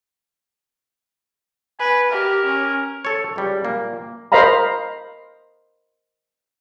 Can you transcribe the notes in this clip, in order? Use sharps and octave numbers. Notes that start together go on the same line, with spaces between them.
B4 G#5
G4 A#4
C#4
A4 C#5
C#2 G3
A#2 A#3
A#4 C5 D#5 F5 A#5 B5